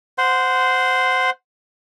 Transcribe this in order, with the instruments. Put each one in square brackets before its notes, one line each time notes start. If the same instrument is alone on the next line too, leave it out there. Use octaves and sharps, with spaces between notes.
[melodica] C5 F#5 C6